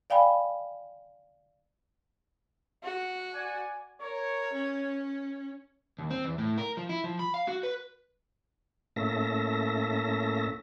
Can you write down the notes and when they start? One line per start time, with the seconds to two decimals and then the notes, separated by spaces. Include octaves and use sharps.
0.10 D5 F5 G5 G#5 B5
2.83 F#4
3.34 D5 G#5
4.01 A#4 C#5
4.53 C#4
5.99 D#2
6.10 C4
6.25 E2
6.38 A2
6.58 A#4
6.77 F3
6.89 E4
7.04 F3
7.19 B5
7.34 F5
7.48 F#4
7.63 B4
8.96 A2 A#3 C#4 A4 E5 A#6